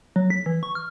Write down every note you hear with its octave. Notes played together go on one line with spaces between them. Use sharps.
F#3
B6
E3
C#6
F6